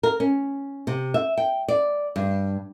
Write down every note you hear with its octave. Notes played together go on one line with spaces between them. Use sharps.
A#4
C#4
C3
E5
G5
D5
G2